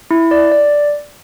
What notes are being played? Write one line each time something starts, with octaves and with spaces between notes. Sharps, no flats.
E4
D5
D5